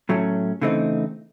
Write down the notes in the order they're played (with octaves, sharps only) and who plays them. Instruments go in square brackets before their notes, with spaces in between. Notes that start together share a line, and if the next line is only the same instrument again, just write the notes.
[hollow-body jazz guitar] A2 F#3 A3 C#4
C#3 E3 A3 C4 D#4